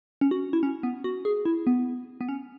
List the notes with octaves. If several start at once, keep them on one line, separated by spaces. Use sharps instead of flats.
C#4
F#4
E4
C#4
B3
F#4
G#4
E4
B3
B3
C#4